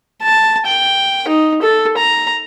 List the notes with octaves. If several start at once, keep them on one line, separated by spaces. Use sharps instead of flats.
A5
G5
D#4
A4
A#5